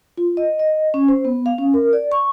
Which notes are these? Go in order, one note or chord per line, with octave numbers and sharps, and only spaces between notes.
F4
D#5
D#5
C#4
C5
B3
F5
C#4
A#4
D5
C#6